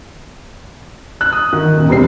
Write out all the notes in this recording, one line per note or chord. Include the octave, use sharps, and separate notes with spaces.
F#6
D#6
D#3
D#1
E1 G3 C4 C7